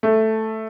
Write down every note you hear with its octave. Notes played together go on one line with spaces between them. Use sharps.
A3